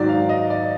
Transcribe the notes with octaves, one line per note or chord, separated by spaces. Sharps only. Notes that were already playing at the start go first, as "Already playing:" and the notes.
Already playing: G#2 D#3 F#3 D5
F5
D#5
D5